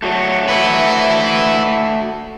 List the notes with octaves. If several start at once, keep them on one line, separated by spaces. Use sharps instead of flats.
A3 F#4 C#5
E4 B4